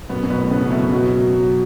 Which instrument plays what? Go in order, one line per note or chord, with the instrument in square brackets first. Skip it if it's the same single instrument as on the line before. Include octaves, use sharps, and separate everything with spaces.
[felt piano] F#2 B2 [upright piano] B3
[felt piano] F#2
[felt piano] B2 [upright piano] B4
[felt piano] A2
[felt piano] A2 C#3 [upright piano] B3
[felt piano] C#3
[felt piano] F#2 B2 [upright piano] E4
[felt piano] F#2 B2 [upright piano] F#3
[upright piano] F#3
F#3